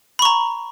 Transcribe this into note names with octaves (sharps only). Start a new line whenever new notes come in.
A#5 B5 C#6